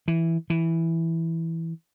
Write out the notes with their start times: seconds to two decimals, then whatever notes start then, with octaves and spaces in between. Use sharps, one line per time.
0.08 E3
0.50 E3